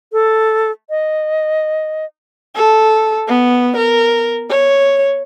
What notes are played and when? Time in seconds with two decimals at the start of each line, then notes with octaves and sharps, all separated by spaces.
0.12 A4
0.90 D#5
2.55 A4
3.28 B3
3.77 A#4
4.50 C#5